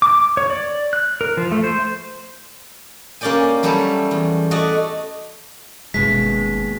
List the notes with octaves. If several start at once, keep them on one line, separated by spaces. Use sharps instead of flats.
D6
C#5
D5
F#6
A#4
F3
A3
C5
A#3 C#4 G4 D5 G5 G#5
F#3 G3 A3 G4 A4 C#5
E2
A3 F#4 D5 D#5
G1 D#2 B2 G#3 C#4 B6